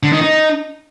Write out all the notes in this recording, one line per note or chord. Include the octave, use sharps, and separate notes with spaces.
D3
D#3
D#4